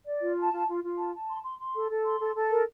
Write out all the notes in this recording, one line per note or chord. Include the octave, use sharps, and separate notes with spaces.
D5
F4
A5
F4
F4
F4
A5
A5
C6
C6
C6
A4
A4
C6
A4
A4
A#4